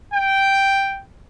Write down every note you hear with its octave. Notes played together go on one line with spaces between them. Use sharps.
G5